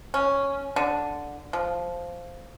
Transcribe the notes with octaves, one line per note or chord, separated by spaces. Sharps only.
C#4
D3
F3